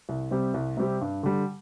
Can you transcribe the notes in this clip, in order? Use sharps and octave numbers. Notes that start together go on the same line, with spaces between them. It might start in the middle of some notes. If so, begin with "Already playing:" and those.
C2
C3 G3 C4 G4
C2
C3 G3 C4 G4
G2
D3 G3